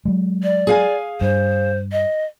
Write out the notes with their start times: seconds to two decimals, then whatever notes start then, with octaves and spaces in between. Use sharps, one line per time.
0.05 F#3 G#3
0.43 D5
0.67 G#4 F5 G#5
1.21 G2 C5
1.92 D#5